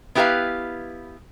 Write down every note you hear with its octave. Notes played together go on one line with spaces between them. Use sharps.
B3 E4 G4 A4 B4 F5